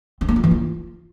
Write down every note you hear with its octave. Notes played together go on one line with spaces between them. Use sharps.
C4
A#3
F4
E3
F4